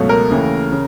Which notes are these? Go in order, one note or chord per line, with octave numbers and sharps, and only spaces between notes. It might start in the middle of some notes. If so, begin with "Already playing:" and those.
Already playing: C#2 B2 F#3 A3
A#4
D#2 C#3 E3 A3
C#3